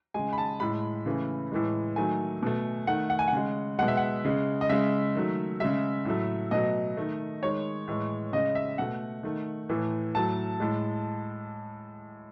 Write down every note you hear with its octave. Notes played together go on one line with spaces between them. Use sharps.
C#3 G#3 G#5
B5
A5
A2 G#3 B5
C#3 E3 A3
A2 E3 G#3
D#3 F#3 A3 G#5
B2 A3
D#3 A3 F#5
F#5
G#5
F#5
C#3 G#3
B2 G#3 F#5
E5
F#5
C#3 G#3
D#5
C#3 G#3 E5
D#3 F#3 A3
C#3 G#3 E5
A2 F#3 A3
B2 F#3 A3 D#5
D#3 A3
D#3 G#3 C#5
A2 E3 G#3
C#3 G#3 D#5
E5
B2 A3 F#5
D#3 A3
A2 E3 A3
A2 F#3 A3 A5
A2 G#3